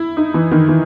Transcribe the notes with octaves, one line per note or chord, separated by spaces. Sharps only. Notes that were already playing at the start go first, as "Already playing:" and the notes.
Already playing: E4
D#4
E3
D#3
E3